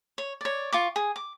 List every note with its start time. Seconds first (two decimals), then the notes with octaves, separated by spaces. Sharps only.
0.18 C#5
0.41 C#5 D5
0.72 F4 C#6 D6
0.96 G#4
1.16 D6